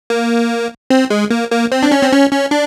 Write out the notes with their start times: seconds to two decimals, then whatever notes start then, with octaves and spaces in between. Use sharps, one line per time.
0.10 A#3
0.90 C4
1.10 G#3
1.30 A#3
1.51 A#3
1.72 C4
1.83 D4
1.91 C#4
2.02 C4
2.12 C#4
2.31 C#4
2.51 D4